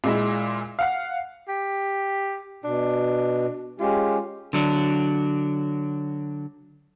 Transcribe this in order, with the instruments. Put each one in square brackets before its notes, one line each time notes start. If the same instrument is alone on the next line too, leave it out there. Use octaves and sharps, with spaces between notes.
[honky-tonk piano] A#2 G#3 E4
F5 F#5 C7
[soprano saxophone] G4
[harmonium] B2 [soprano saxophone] D4
[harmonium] G#3 C#4 G4 [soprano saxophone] F4
[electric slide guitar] D3 F#3 D4